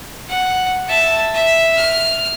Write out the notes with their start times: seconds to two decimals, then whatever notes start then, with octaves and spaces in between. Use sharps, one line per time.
0.29 F#5
0.88 E5 A5
1.34 E5
1.77 F6